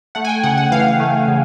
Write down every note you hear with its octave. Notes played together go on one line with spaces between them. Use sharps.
A3 F#5
G#5
G5
C#3 F#5
F#5
E3 F5
A3
C#3